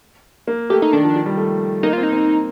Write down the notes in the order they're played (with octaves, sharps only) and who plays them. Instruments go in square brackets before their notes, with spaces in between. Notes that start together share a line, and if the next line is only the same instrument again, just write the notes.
[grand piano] A#3
[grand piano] A3 [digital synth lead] G4
[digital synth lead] D#4
[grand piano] D#3 [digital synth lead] D4
[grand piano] F3
F3
G3
A3
[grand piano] A#3 [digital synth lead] D#4
[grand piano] C4 [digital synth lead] F4
[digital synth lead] D#4
[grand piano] C4